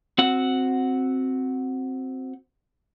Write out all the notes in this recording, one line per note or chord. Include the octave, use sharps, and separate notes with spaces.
C4 F#4 F#5